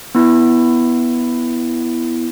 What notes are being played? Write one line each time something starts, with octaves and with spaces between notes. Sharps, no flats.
B3 E4